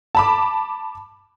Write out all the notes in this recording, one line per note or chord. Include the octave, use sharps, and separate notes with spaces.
A5 B5 D6